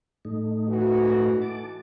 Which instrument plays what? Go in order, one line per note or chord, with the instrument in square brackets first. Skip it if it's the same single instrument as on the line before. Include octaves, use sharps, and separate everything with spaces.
[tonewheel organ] A2 A3 D#4
[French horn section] E3 F#4
[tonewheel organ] A5 D6